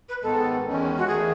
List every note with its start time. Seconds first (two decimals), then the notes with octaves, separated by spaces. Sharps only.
0.09 B4
0.22 G#2 D#3 G#3 B3 A4
0.65 E2 D#3 G#3 C#4
0.98 F#4
1.07 E2 D#3 A3 G#4